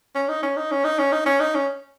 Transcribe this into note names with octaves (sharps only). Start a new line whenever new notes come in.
C#4
D#4
C#4
D#4
C#4
D#4
C#4
D#4
C#4
D#4
C#4